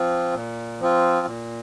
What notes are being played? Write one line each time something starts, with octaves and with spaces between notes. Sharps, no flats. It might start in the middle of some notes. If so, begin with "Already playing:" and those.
Already playing: F3 C4 F4
A#2
F3 C4 F4
A#2